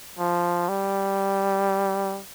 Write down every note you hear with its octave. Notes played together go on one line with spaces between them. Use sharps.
F3
G3